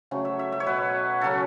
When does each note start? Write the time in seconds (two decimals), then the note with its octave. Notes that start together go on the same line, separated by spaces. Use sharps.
0.11 C#3 F#3 A3 C#4
0.25 E5
0.39 E5
0.52 E5
0.60 C#5
0.66 B2 B3 B4
1.21 C#3 F#3 C#4 A4